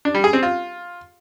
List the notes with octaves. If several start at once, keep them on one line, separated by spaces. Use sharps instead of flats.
D4
G3
G#4
C4
F4